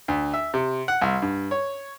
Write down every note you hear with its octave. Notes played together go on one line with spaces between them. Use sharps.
D2
E5
C3
F#5
C2
G2
C#5